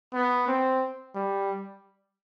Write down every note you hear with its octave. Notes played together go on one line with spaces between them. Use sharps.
B3
C4
G3